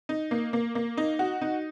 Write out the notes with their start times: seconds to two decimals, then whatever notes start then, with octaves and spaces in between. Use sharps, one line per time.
0.09 D#4
0.31 A#3
0.53 A#3
0.75 A#3
0.97 D#4
1.19 F#4
1.41 D#4